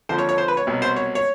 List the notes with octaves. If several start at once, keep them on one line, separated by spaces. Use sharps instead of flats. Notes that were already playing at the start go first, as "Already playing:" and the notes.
F2 D3 F3 C5
C#5
C#5
C5
B4
C#5
C2 B2 F#3
C5
C#5
C#5